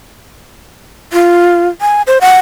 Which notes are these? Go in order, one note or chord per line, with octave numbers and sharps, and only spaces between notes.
F4
G#5
C5
F#5